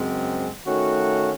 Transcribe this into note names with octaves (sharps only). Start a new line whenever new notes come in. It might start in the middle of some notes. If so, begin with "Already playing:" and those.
Already playing: F#2 C#3 G#3 C4
D#3 A3 C#4 F#4